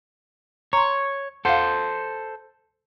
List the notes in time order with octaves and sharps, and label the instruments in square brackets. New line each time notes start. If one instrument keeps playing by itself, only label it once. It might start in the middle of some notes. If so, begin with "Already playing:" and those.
[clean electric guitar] C#5 [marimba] A#5 C6
[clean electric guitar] A4 C5 [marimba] F5 F#5